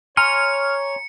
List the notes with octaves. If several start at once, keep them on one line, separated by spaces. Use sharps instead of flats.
C#5 G#5 A#5 C6 F6 C#7